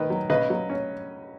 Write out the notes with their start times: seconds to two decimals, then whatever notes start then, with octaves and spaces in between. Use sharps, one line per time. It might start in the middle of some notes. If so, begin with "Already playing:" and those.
Already playing: D#3 B4 D#5
0.10 F#3
0.30 C#3 B4 D#5
0.50 F#3
0.70 C#4